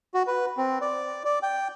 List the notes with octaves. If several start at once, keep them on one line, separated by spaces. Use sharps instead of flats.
F#4
B4
C4
D5
D5
G5